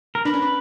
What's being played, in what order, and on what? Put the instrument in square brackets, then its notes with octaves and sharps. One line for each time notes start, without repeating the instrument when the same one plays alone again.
[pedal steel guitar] A#4
[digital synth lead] D4 [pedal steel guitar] B4
[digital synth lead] C#4
D4